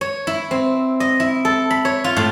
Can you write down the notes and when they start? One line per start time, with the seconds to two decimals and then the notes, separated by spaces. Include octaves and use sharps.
0.01 C#5
0.27 E4
0.51 C4
1.00 D#5
1.20 E4
1.45 A4
1.71 B5
1.85 C#5
2.04 F4
2.16 A2